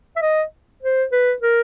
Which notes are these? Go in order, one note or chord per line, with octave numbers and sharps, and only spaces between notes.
E5
D#5
C5
B4
A#4